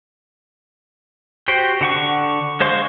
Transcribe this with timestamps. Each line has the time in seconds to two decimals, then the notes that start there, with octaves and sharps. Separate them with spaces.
1.48 F#4 G4 C5 G5
1.81 D3 F#5 C#6
2.60 G#3 C5 F5 C6 C#6